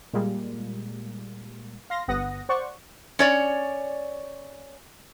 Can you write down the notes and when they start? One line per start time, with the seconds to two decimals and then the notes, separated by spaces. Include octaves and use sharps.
0.13 A#2 G3 G#3 A#3
1.90 F5 C6 A#6
2.08 G1 B3 F#5 D#6 A#6
2.49 C5 D5 F#5 C#6
3.19 C#4 C#5 D5